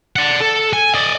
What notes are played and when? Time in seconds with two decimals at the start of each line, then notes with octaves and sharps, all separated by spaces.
0.16 D5 F#5
0.40 A4
0.73 G#5
0.94 D5 D#5